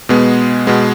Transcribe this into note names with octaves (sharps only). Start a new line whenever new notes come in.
B2 G#3 B3
B2 G#3 B3